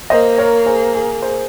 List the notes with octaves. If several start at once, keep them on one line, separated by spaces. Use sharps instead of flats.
A#3 C5 D#5
A#4 C#5
G#4 C5
G#4
G#4 C5